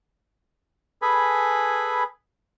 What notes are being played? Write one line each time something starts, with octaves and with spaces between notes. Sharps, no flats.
G#4 A4 B4 G#5 B5